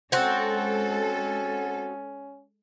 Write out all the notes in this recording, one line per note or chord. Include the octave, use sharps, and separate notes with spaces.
G#3 C4 C#4 F#4 A4